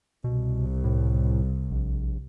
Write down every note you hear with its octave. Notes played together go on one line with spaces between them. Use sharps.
C2 B2
A2
A#1